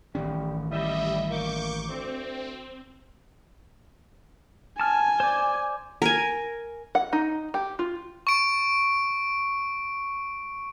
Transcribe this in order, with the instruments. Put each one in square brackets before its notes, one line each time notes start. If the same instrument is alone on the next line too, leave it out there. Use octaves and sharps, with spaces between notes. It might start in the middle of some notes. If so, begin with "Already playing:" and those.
[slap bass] A1 D#3 C#4 [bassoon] G3
[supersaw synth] G3 D#5 E5 [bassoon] E4
[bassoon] A#3 [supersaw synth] C#6 D6 G6
[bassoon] D2 [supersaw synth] C4
[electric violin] G#5 [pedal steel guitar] A5 F6
[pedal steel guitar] C5 D5
[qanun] A#4 G#5
[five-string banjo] F#5
D#4
G4
F4
[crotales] C#6 D7